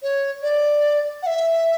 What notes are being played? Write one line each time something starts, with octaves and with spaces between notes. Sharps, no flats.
C#5
D5
F#5
E5